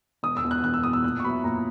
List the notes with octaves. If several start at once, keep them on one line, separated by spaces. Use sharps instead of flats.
E1 D#6
E6
E2 B2
F#6
E1 F#6
E6
E2 B2 D#6
E6
A#2 F#6
C#6
F#3 B3 E4 B5
A#2 A#5